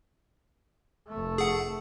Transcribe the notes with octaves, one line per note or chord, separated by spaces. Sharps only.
F1 A3
G#4 F#5